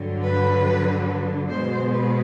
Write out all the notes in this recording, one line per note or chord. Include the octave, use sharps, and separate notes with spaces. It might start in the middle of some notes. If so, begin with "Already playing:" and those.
Already playing: G2 D3 F#3
B4
B2 G#3 C5
B4